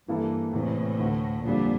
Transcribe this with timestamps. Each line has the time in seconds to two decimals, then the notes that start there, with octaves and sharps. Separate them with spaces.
0.08 G2 E3 A#3 E4 A4
0.53 E2 A2 C3 E3
1.00 D2 D3 A3
1.45 F2 A#2 D3 G3 D4